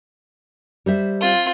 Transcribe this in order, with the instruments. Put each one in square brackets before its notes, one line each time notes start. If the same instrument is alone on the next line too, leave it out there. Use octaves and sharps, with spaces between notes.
[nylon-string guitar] G3 C5 E5
[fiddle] C4 F4